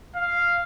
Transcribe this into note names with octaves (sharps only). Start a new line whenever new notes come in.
F5